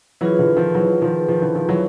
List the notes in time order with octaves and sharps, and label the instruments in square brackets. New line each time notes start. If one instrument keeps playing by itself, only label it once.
[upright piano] E3 F#3 [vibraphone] F4 G#4 B4
[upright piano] D3 E3
D#3 F3
E3 F#3
D#3 F3
D#3 F3
D3 E3
D#3 F3
E3 F#3